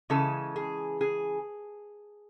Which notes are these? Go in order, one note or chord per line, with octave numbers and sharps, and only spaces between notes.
C#3 E3 G#3 A4
G#4
G#4